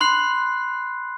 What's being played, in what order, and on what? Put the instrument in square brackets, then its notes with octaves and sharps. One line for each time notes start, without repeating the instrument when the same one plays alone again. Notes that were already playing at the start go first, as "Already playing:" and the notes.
[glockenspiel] B5 C6 F#6 C7